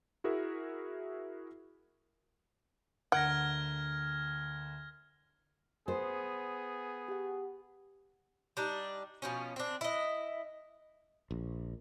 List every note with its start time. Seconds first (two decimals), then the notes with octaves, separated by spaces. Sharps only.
0.24 E4 F#4 G#4 A#4 E5
3.12 D2 A#4 F#5 F6 G#6 A#6 D7
5.88 B3 G#4 C5
7.08 G4 F#5
8.57 G3 D4 D#4
9.22 B2 F3 C#4
9.56 C4 D4
9.81 E4 D#5
11.31 A#1